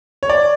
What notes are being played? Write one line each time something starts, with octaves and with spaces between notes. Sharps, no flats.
C#5
D5